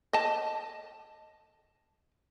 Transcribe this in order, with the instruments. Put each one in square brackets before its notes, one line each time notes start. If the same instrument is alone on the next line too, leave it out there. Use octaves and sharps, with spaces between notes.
[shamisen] D#5 A5